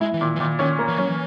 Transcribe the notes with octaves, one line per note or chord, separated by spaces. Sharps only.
G#3 E4
E3
A#2 D#3
E3
A#2 D#3
D#3 C#4
A#3
E3
F#3 C#4
E3